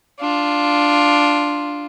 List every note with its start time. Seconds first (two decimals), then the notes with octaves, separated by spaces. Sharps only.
0.20 D4 F4